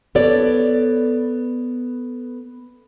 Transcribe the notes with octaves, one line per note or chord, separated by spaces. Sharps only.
B3 A4 C#5 D5